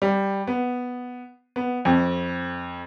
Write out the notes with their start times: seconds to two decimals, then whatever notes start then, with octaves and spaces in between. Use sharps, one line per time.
0.02 G3
0.47 B3
1.56 B3
1.85 F2